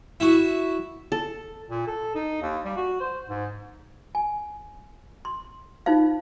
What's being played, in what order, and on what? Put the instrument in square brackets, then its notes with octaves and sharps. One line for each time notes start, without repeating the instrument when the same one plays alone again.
[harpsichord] E4 F#4
[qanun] A4
[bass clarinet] A#2
A4
D#4
D#2
G3
F#4
C5
G#2
[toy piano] G#5
C6
D#4 F4 C5 F5